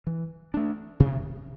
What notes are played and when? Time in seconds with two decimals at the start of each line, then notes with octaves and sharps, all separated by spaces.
0.07 E3
0.54 A3 D4
1.00 C3